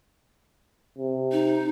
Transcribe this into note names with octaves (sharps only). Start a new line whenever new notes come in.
C3
D#4